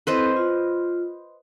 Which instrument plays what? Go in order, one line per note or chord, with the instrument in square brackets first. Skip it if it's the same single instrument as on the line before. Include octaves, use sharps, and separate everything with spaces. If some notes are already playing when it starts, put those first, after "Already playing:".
[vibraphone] C4 E4 A4 [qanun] B4 C5 D#5
[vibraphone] F4